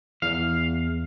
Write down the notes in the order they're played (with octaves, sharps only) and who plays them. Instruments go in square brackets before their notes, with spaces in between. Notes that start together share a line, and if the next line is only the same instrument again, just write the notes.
[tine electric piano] E2 [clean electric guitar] F5